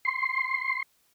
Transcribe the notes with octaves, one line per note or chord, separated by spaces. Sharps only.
C6